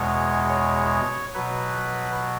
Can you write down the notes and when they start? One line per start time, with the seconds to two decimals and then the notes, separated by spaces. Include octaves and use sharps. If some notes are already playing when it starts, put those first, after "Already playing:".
Already playing: E2 B2 G#3 C#5
0.49 C#5
1.34 B2 F#3 B4